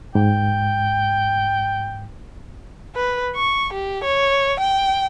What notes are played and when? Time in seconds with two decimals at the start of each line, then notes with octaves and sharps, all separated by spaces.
0.15 G#2 G5
2.95 B4
3.36 C#6
3.73 G4
4.04 C#5
4.60 G5